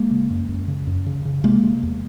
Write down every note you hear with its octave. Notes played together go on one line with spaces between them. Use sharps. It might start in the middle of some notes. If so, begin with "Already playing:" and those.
Already playing: G#3 A#3
C#3
F#2
F#2
C#3
F#2
C#3
C#3
C3 G#3 A#3
C3
E2